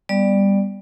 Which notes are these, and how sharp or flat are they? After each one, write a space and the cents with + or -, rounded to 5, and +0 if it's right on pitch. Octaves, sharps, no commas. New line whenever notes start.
G3 +15 B3 +0 D5 +15